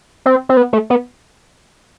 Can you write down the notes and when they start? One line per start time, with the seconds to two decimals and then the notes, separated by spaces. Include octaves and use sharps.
0.26 C4
0.49 C4
0.57 B3
0.73 A3
0.90 B3